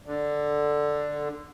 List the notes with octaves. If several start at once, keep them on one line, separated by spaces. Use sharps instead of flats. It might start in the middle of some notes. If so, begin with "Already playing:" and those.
D3